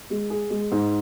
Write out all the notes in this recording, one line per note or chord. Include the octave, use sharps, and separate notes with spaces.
G#3
G#4
G#3
G#2